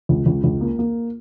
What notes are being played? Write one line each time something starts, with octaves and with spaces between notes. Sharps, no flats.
C#2
C#2
C#2
A#3
A#3